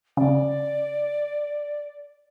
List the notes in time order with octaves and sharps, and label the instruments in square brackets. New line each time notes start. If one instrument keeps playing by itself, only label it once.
[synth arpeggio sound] C#3 [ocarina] D5